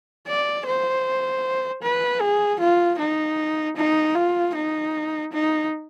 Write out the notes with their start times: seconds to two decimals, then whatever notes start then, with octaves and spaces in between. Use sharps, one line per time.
0.27 D5
0.66 C5
1.83 B4
2.21 G#4
2.60 F4
2.99 D#4
3.77 D#4
4.15 F4
4.55 D#4
5.33 D#4